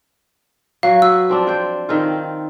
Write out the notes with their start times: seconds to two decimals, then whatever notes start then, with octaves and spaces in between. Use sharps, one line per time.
0.83 F#3 F#4 F5
1.02 F#4 B4 E6
1.29 F3 C4 D4
1.47 C5 G5
1.89 D#3 C4 F4